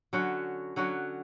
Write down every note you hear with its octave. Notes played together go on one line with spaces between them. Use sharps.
D3 F#3 C#4 F#4
D3 F#3 C#4 F#4